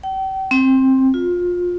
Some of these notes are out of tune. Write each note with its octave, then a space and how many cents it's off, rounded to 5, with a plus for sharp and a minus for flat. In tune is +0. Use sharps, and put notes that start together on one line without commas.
G5 -40
C4 +15
F4 +25